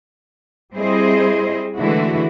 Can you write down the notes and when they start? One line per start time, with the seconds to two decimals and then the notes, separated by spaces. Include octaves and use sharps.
0.74 G3 C4 E4 G#4 C5 D#5
1.76 D3 E3 G#3 A3 E4 F#4